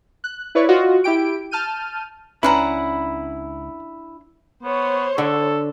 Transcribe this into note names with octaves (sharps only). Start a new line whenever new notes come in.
F#6
E4 B4 C#5 D5 C#6
F4 F#4 D#5
E4 G4 G5 D7
A5 F6 G6 D#7
C#2 C#4 D4 E4 B4 F#5 A#5 B5
B3 C5 C#5
D3 A4